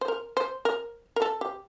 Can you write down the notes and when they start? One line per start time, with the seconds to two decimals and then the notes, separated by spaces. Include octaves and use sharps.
0.01 C5
0.08 A#4
0.37 C5
0.65 A#4
1.16 A#4
1.22 A4
1.41 G4